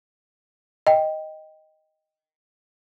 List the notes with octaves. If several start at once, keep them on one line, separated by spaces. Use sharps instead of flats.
D#5 G5